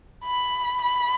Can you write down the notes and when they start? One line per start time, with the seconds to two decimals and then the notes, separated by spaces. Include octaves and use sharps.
0.25 B5
0.81 B5